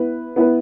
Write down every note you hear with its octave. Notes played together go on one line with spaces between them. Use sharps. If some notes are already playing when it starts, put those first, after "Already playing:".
Already playing: B3 E4 B4
B3 E4 B4